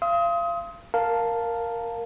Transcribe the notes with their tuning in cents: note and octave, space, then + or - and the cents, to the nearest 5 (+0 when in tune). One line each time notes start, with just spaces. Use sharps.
F5 -30 C6 +0 D#6 +30
A#4 +0 F5 +5 A5 +0